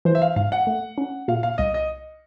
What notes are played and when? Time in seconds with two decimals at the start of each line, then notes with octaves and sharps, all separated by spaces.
0.05 E3 C5
0.15 E5
0.22 F5
0.36 G#2 F5
0.52 F#5
0.67 A3
0.98 C#4
1.28 A#2 F5
1.43 F5
1.58 C2 D#5
1.74 D#5